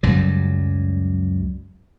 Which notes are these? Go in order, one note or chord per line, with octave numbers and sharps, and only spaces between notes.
C#2 F#2 F#3 G3